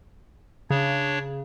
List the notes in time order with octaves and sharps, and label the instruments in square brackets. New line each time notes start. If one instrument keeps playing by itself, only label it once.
[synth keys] C#3 [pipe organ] D4 C#5